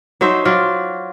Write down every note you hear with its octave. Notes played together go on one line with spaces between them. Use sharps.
F#3 D#4 C5 E5
F#3 F4 D5